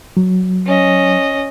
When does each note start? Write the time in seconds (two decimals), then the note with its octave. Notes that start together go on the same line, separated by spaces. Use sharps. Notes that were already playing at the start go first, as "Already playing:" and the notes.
0.17 F#3
0.66 C#4 D#5